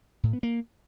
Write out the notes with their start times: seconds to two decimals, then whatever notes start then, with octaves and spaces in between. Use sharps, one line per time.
0.23 A2
0.33 B3
0.43 A#3